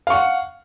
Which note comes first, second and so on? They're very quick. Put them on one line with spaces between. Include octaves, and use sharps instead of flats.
F5 C#6 F#5